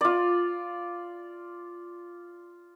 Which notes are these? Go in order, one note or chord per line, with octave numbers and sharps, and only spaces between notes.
F4 D5